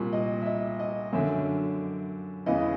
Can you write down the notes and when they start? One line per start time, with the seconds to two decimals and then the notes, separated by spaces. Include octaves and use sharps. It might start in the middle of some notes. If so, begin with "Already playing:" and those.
Already playing: C2 A#2
0.13 D#5
0.42 E5
0.46 D#5
0.79 D#5
1.13 F#2 D3 E5
2.46 E2 C#3 E3 D#5